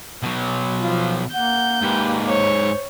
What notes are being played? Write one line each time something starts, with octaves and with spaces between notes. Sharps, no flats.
B2 F#3
F3 F4
A#3 F#5 G6
G#2 G4 B4
C5 C#5